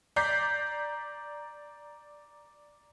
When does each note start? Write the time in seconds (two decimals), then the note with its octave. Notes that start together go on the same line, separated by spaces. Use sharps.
0.16 D5 A#5 D6 G6 B6 C7